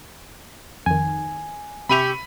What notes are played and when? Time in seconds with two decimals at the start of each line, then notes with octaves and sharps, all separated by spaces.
0.86 F2 D#3 G#5
1.89 C3 G4 E5 B5 C#6 D#7 F7